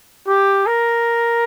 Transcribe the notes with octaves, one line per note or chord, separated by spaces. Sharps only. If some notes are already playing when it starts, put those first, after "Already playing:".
G4
A#4